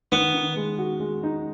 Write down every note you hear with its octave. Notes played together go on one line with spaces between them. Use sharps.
D#3 B3
D#3
G#3
F#4
G#3
D#4